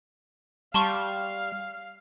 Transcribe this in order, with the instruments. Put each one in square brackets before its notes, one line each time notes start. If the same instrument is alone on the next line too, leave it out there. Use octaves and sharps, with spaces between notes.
[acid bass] G3 [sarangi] F5 [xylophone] A5 C6 C#6